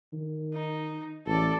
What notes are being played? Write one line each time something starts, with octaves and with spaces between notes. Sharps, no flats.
D#3
D#4
A1 A4 D5